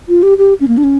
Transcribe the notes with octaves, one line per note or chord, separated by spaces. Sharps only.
F4
G4
G4
C#4
A#3
D4
C#4